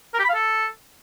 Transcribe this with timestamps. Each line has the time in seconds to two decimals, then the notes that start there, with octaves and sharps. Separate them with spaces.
0.14 A#4
0.19 G4
0.24 B5
0.29 F5
0.35 A4